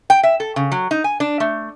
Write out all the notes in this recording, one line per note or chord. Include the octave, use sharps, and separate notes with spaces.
G5
E5
A4
C#3
F#3
D#4
G#5
D4
A3